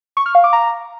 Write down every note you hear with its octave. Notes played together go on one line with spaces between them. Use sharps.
C#6
F6
F5
D6
A#5